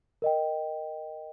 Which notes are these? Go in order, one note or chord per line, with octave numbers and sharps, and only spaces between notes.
A#4 D#5 G5